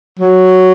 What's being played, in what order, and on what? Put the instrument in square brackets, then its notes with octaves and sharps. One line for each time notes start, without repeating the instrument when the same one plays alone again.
[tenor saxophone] F#3